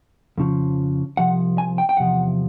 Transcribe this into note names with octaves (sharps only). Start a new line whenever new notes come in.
F2 C#3 F3
C2 C3 F3 F#5
G#5
G5
G5
E2 C3 F3 F#5